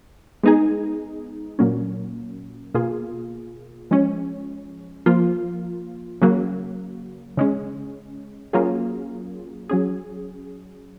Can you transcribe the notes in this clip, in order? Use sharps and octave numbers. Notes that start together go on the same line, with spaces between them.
G#3 B3 D#4 G#4
A#2 F#3 A#3 C#4
B2 A#3 F4 G#4
F3 G#3 C#4
F3 A#3 F4
C#3 F#3 A#3
C#3 G#3 C#4
F#3 A#3 C#4 F4 G#4
F#3 C#4 G#4